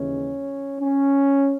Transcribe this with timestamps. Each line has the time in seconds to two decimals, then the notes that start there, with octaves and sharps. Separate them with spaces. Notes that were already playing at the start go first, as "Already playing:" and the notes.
Already playing: D#2 C#3 E3 G#3 C#4
0.80 C#4